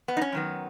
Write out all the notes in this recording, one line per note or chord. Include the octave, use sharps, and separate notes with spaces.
B3
D#4
C#4
F#2 D#3 F#3 B3